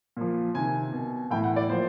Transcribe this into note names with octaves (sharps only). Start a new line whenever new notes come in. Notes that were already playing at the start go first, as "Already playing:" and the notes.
A#2 F3
C3 D#3 G#5
B2
A2 E3 G5
F#5
D5
A#2 F3 C5